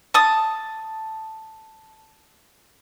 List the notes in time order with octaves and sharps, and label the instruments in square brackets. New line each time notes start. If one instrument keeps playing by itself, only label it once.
[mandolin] A5 D#6